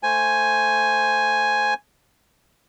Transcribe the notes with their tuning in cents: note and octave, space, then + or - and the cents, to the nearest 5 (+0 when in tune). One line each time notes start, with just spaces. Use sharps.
A3 +10 C5 +0 G#5 +0